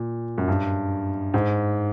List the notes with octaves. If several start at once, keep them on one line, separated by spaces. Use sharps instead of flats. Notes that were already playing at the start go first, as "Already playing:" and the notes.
Already playing: A#2
F#2
G2
G#2